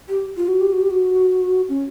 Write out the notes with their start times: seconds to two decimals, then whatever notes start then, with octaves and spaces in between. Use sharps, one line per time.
0.09 G4
0.37 F4
0.48 F#4
0.61 G4
0.73 F#4
0.81 G4
0.90 F#4
1.69 C#4